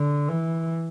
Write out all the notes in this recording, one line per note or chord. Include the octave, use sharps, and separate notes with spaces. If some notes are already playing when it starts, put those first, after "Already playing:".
Already playing: D3
E3